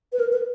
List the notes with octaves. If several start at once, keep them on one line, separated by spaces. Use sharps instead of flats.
B4
A#4
B4